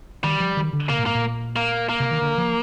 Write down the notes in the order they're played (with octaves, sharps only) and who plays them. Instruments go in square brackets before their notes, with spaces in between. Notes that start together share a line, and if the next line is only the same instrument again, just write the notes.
[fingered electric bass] D#3 [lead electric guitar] G3
[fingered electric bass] F3
D#3
D3
[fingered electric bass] C3 [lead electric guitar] A#3
[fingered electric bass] A#2
[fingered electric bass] G#2 [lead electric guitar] A#3
[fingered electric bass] A#2
[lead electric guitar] A#3
A#3
[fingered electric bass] C3
D#3
D3
F3